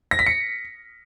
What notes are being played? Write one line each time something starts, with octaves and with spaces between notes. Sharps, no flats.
A#6
B6
C#7